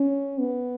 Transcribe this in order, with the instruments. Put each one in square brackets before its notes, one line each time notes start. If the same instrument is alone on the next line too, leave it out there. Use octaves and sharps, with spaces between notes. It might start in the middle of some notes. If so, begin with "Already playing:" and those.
Already playing: [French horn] C#4
B3